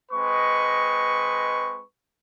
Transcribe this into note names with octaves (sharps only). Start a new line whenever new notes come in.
G#3 C4 B4 D#5 C#6